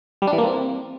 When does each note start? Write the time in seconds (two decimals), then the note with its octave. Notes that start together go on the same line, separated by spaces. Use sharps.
0.22 G3
0.27 D4
0.33 E3
0.38 A#3
0.44 C4